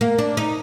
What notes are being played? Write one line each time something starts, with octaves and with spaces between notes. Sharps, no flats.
A#3
D4
D#4